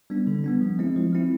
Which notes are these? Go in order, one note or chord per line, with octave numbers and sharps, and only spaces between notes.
G3 B3 D4
D3
G3 B3 D4
F3
G#3 C4 E4
F3
G#3 C4 E4